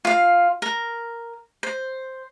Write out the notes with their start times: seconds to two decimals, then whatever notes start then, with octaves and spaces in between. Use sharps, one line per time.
0.05 F4 F5
0.62 A#4
1.63 C5